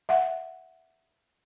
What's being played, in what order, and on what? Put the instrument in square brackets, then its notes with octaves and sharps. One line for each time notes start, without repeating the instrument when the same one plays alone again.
[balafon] E5 F#5